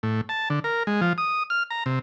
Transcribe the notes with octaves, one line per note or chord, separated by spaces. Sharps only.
A2
A5
D3
A#4
G#3
F3
D#6
F6
A#5
C3